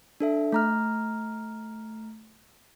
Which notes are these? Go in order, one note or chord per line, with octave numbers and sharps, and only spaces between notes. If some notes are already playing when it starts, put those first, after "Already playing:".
D4 A4 E5
A3 A#5 F6